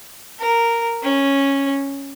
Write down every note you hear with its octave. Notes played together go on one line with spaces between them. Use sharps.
A#4
C#4